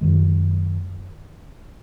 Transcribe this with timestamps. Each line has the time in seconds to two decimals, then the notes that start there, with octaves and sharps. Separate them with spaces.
0.01 F#2 D#3 G#3